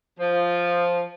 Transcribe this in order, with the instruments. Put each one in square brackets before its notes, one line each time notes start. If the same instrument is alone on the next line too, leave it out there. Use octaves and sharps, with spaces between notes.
[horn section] F3